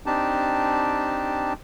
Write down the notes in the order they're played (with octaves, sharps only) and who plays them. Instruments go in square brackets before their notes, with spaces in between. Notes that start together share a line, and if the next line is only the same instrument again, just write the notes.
[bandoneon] C4 D4 D#4 G4 A5